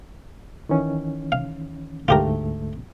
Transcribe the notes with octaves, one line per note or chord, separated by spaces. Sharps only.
D#3 E3 C#4
F5
D2 G#2 A3 F4 G4 A#4